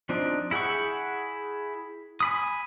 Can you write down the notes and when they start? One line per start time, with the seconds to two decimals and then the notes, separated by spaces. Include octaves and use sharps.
0.09 F3 C4 D4 D#4
0.51 E4 G#4 F#5 G5 C#6
2.20 G#5 B5 D#6